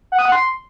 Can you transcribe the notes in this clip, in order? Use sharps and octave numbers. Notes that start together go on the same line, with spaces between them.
F#5
D#6
F#5
C6